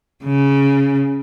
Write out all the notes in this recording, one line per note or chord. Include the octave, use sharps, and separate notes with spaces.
C#3